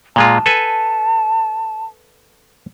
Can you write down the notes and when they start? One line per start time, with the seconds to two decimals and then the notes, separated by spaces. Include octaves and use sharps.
0.16 A#2 G#3 F4 A5
0.46 A4 B4 G#5